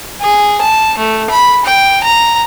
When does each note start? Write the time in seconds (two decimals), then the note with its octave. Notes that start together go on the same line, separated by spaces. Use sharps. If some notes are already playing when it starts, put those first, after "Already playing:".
0.22 G#4
0.61 A5
0.98 A3
1.30 B5
1.65 G5
2.04 A#5